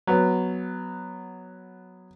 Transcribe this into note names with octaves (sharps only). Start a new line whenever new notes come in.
F#3 B3